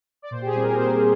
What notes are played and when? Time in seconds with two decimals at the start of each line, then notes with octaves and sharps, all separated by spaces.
0.22 D5
0.31 A#2 C5
0.42 G4
0.46 G#4
0.54 G3 C4
0.62 A#4
0.78 A#2 C5